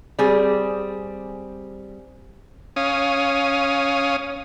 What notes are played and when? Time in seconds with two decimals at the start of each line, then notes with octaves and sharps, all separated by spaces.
0.19 G3 C4 G#4
2.76 C#4 F5 D#6